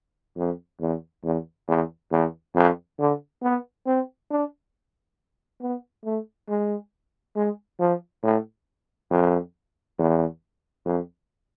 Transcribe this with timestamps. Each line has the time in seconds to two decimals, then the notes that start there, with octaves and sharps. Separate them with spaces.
0.37 F2
0.80 E2
1.24 E2
1.68 E2
2.12 E2
2.55 F2
2.99 D3
3.43 B3
3.86 C4
4.31 D4
5.61 B3
6.05 A3
6.49 G#3
7.36 G#3
7.80 F3
8.23 A2
9.11 F2
9.98 E2
10.85 F2